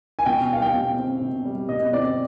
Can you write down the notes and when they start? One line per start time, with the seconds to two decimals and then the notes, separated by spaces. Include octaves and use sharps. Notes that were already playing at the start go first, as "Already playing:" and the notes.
0.19 G#5
0.26 B2 G5
0.50 G3 F5
0.62 G5
0.74 B2
0.98 C4
1.21 B2
1.45 G3
1.69 B2 D#5
1.93 C4 D5